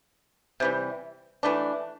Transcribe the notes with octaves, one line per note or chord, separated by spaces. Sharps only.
C3 E3 G3
E3 A3 D4